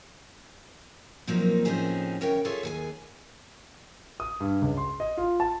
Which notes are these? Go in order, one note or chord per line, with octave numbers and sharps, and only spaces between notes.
A#2 F3 F#3 A#3 C4 D#4
A2 F3 C4 C#4 D#4 G#4
E2 C#3 A#4 C#5 G5
F4 G#4 A4 C#5 E5
D#2 G#4 G#5
D#6
G2
C#2
C6
D#5
F4
A5